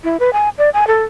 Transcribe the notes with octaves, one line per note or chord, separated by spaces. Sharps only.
E4
B4
G#5
D5
G#5
A4